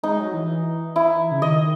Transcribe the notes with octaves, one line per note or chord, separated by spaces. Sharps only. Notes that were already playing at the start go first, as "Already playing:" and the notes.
G#3 D#4
F#3
E3
E4
C#3
D#3 D#5